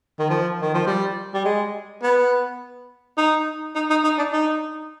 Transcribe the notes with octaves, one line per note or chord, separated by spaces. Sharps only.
D#3
F3
D#3
F3
G3
G3
G#3
B3
D#4
D#4
D#4
D#4
D4
D#4